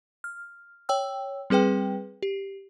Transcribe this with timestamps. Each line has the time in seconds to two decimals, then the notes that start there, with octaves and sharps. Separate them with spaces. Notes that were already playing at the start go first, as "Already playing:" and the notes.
0.24 F6
0.89 C#5 G5 E6
1.50 G3 C4 G#4 B4 G5
2.23 G4